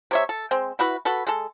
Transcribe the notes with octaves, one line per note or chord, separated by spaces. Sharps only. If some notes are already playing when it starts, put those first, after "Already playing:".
C3 C#5 E5
A4
G#3 C4
E4 F#4 B4
F#4 A4 B4
G#3 A4